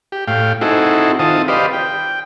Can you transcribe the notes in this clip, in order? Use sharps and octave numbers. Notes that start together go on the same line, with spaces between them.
G4
A2 F5 G5
C4 D#4 E4 F#4 G#4 A4
D#3 C4 F4 A5 D#6
G4 B4 C5 D5 D#5 F5
G5